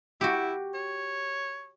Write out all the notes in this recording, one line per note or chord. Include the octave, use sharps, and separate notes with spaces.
E4 F#4 G4
C#5